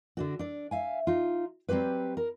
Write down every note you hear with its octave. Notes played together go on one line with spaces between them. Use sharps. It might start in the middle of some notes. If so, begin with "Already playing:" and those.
D3 D4 F#4
D4 D5
E5 F5 G#5
D#4 F4
F#3 G3 C4 G4 B4
A#4